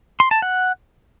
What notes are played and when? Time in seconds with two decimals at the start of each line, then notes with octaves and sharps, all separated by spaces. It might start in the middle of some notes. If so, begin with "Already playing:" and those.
0.20 C6
0.31 A5
0.42 F#5